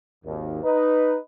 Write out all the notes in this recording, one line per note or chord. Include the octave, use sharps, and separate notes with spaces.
G#1 D#2
D#4 B4